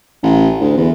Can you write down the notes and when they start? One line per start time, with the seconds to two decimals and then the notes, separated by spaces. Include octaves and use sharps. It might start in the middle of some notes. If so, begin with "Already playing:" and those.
0.23 A1
0.61 D2
0.77 E2